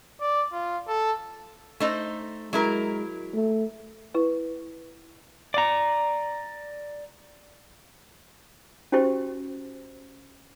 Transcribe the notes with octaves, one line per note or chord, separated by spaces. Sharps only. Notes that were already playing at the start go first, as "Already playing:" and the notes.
D5
F4
A4
A3 D#4 C5
F#3 G#3 E4 A#4
A3
E4 B4
D5 A#5
C#4 F#4 G4 C5 C#6